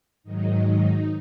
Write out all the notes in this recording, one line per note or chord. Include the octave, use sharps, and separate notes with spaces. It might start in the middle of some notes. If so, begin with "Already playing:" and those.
G#2 D#3 F#3 D#4
D#4